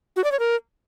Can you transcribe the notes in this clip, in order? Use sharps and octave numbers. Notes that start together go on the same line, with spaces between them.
F#4
D5
C#5
A#4